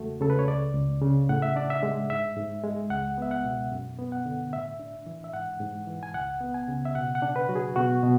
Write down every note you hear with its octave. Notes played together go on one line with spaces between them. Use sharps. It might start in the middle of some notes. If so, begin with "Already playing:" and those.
Already playing: E2 C#3 G#3 A3 F#4
C#3 A4
B4
C#5
C#2 D5
C#2
C#3
A2 F#5
E5
D4 D5
E5
G#3
G#2 E5
G#2
G#3
C#2 F#5
B3 E5
F#5
B2
F#2
B3
F#5
D3
A2 E5
D4
E3
E5
G#2 F#5
G#2
E3
G#5
C#2 F#5
B3
G#5
C#3
E5
B2 F#5
F#5
D4
B4
F#3 F#4
G#4
B2 F#4
B2